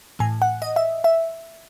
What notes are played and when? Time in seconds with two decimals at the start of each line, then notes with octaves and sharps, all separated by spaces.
0.19 A2 E3 G#5
0.42 F#5
0.62 D#5
0.76 E5
1.04 E5